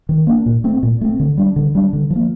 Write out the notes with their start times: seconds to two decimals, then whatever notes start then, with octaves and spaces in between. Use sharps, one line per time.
0.09 D#3
0.27 A#3 D4
0.46 A#2
0.64 A3 C4
0.83 A#2
1.01 A3 C4
1.20 D3
1.37 G3 D4
1.56 D3
1.75 G3 D4
1.93 D3
2.10 F3
2.16 A#3